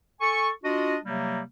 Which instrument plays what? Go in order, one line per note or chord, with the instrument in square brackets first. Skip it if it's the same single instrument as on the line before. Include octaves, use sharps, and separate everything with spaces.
[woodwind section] A4 G#5 C#6
D4 F4 F#4 D#5
C3 F#3 G3 A#3